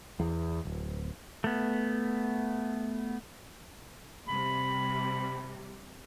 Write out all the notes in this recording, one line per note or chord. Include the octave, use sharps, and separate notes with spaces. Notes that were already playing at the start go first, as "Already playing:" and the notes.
E2
D1
A3 B3
C3 G3 B5